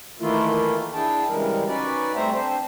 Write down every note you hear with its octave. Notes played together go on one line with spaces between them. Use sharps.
D#3 E3 A3 A#3 E4 F4
D4 E4 G#4 G5 A5
C#3 E3 G3 G#3 A#4
C#4 D#4 F#4 B4 D5
G3 A3 C4 C5 E5 A#5
C4 D4 C5